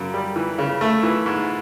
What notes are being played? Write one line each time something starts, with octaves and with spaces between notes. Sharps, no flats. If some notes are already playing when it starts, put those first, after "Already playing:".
Already playing: F#2 C#3
G3
E3
C#3
A3
E3
G#2